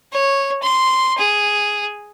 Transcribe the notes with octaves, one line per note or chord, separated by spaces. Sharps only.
C#5
C6
G#4